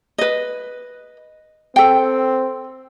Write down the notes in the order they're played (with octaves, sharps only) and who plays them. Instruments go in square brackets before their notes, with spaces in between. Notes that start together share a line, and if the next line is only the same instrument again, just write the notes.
[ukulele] B4 D#5
[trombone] C4 [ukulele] A4 G5